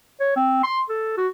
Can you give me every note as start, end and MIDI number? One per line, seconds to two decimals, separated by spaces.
0.20 0.33 73
0.36 0.59 60
0.63 0.79 84
0.89 1.13 69
1.17 1.28 66